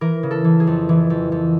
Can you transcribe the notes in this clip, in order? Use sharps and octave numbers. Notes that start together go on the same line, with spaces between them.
E3 A#4
C#3
A4
E3
G#4
F2
E3
F2
F2